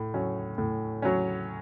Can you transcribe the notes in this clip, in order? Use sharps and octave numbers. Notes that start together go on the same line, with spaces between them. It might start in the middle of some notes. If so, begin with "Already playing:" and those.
Already playing: A2
F#3 C#4
A2
F#3 C#4